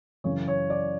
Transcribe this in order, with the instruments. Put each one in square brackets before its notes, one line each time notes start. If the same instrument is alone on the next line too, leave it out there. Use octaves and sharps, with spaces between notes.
[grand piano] F#2 C#3 E3 C#5
C#5
D5